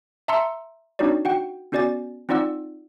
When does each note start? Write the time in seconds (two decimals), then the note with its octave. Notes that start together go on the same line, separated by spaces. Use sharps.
0.28 E5 A5 A#5 C6 E6 C#7
0.99 C4 D4 D#4 F#4 C#5 D5
1.25 F#4 F#5 G5
1.72 B3 C#4 F#4 D5 G#5 A6
2.29 C4 D#4 F4 D5 F#5 E6